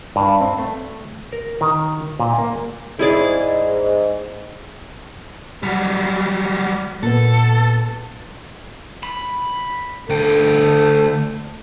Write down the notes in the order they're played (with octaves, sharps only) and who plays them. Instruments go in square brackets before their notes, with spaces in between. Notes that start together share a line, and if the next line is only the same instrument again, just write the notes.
[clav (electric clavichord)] G2
C4
A3
A#4
D#3
A#2
A#3
[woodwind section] G#2 [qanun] E4 G#4 D5
[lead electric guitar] F#3 G3
[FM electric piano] A#2 B3 [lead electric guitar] A4
[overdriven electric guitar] B5
[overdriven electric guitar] D2 G5 [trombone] A4